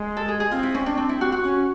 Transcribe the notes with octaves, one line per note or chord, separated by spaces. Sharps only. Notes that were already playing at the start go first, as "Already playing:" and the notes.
Already playing: G#3
A4
G#4
G#4
C4 F4
E4
C#4
D4
D4
E4
F#4
F#4
C#4